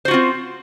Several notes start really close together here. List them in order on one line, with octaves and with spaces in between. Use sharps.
C5 F#4 F4 C4